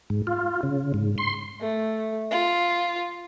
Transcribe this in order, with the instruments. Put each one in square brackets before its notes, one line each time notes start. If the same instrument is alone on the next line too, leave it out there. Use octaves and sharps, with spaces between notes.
[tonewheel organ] G#2
F4
C#3
G#2
C6
[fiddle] A3
F4